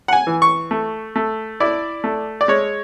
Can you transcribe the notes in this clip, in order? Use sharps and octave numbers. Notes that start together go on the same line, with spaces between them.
F#5
G#5
E3
C#6
A3
A3
E4 D5
A3
D5
G#3 C#5